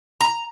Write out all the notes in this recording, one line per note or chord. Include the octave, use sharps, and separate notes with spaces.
A#5